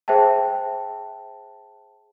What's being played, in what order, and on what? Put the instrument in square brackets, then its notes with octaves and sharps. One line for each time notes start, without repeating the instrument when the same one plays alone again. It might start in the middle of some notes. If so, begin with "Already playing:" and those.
[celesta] G#4 C5 E5 G5 A5